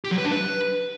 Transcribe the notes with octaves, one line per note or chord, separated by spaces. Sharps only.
G4
F#3
B4
D4
B4